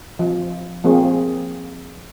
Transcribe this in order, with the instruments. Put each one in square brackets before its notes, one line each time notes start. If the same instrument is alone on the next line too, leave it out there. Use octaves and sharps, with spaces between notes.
[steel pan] F3
F3 A#3 C4 G#4